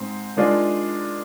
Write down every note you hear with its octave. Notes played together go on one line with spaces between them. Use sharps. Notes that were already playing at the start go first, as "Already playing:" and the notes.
Already playing: G#2 C4
D#3 G#3 D4 F4